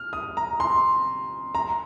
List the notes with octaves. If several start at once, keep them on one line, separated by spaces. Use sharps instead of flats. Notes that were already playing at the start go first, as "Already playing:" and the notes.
Already playing: F6
D#6
A#5
C6
A#5